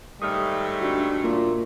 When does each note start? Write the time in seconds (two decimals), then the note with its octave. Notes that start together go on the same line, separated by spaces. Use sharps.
0.22 G#2 D#3 G3 A3 D#6 F6
0.81 D4 F#4
1.24 A#2